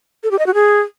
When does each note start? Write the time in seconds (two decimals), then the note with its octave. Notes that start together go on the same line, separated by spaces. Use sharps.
0.23 A4
0.31 G4
0.39 D#5
0.47 F#4
0.54 G#4